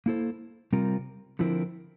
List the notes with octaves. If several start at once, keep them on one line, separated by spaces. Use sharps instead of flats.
A#3 E4 A4 C5
C3 G3 C4 F4 A#4
D3 F3 C4 E4 A#4